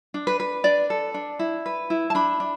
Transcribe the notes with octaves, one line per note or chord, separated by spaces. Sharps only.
D4
B4
B4
D4 D5
A4
D4
E4
B4
E4
A5
D4 B5
D4